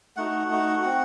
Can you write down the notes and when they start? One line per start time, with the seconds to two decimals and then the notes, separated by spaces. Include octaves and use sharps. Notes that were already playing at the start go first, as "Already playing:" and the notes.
0.16 A3 D#4 F#4 F#5
0.49 A3 D#4 F#4
0.82 C4 F#4